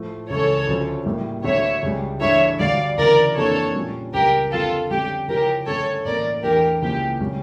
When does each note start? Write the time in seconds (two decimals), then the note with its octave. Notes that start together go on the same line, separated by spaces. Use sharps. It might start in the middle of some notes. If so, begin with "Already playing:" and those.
Already playing: A2 F3 A3
0.29 C#2 C#3 E3 A4 C#5
0.67 D2 C#3 F3 C#4
1.06 A2 G3 A#3 E4
1.44 D2 D3 A3 C#5 E5
1.83 C#2 C#3 G3
2.21 G2 E3 A3 D4 C#5 E5
2.59 D2 D3 G3 D5 F5
2.98 D2 C#3 E3 A#4 D5
3.36 F2 E3 A#3 D4 A4 C#5
3.75 A#2 G3 C#4
4.13 C#2 C#3 G3 G4 A#4
4.51 F2 D3 F3 F4 A4
4.90 F2 D3 G3 C#4 G4
5.28 C#3 F3 C#4 E4 G4 A#4
5.66 G2 D3 A3 C#4 A4 C#5
6.05 A2 E3 A#3 C#4 A#4 D5
6.43 E2 E3 A3 D4 G4 A#4
6.82 C#2 C#3 F3 A#3 E4 G4
7.21 C#3 G3 C#4